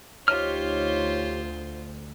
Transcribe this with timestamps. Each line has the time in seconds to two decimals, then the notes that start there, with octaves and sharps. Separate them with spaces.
0.28 D2 D#4 F4 G4 C5 C#5 F6